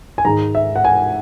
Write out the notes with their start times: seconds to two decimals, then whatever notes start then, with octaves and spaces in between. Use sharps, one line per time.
0.18 G#5
0.25 G#2 D#3 G#3 A#5
0.55 E5
0.76 F#5
0.84 G#5